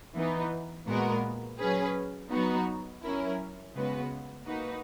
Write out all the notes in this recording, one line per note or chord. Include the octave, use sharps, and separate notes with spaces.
E3 B3 D#4
A#2 G#3 B3 F#4 A#4
F#3 C#4 G#4 B4
F#3 B3 D#4 F#4
F#3 C#4 E4 A#4
C#3 G#3 B3 F#4 B4
A#3 D#4 F#4 B4